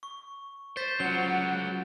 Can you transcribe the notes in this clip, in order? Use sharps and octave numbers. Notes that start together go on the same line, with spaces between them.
C#6
C5 G6 A6 B6
F#3 C#4 F4 F#5 G7